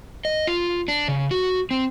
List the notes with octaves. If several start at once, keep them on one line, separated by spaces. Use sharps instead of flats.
D#5
F4
D4
C#3
F#4
C4